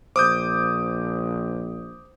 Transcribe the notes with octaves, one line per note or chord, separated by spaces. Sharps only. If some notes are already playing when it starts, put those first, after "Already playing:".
A#1 C5 D6 D#6 G6